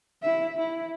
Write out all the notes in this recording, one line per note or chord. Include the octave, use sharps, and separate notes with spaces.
E4 E5
E4